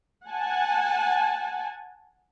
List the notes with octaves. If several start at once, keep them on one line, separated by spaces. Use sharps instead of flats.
F#5 G#5 A5